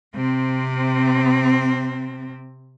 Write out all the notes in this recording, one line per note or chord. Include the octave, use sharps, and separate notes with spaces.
C3 C4